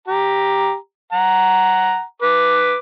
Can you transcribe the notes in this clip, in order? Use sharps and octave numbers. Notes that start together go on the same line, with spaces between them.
G4 A#5
F#5 A#5
B4 D6